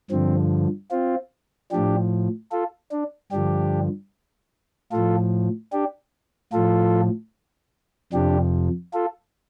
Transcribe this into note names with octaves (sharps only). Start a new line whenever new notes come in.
G2 D3 F3 C4
C4 F4
A2 F3 D4 G4
F4 A4
D4
G2 D3 F3 D4 G4
A2 F3 F4 A4
D4 G4
A2 F3 F4 A4
F2 C3 F3 D4 G4
F4 A4